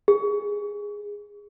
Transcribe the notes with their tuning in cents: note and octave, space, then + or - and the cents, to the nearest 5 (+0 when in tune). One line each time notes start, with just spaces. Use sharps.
G#4 -10